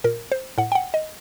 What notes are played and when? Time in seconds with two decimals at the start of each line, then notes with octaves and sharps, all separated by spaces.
0.04 A#2 A#4
0.32 C5
0.58 A2 F#5
0.72 G5
0.75 F#5
0.94 D#5